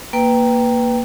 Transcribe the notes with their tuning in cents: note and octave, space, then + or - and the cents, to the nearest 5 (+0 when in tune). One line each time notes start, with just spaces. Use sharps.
A#3 +0 B4 +0 G5 +0